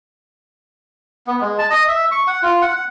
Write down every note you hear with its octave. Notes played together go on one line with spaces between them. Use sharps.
B3
G#3
A5
D#5
E5
C#6
F#5
F4
F#5
F#5